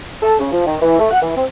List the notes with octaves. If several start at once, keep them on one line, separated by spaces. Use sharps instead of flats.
A4
C#3
F3
D#3
E3
A3
F#5
E3
C4